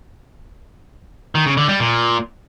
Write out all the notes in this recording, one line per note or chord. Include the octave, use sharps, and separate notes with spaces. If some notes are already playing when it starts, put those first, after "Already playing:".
D#3
C#3
D3
G3
A#2